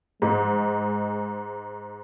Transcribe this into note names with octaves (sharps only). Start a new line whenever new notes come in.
G#2 G#3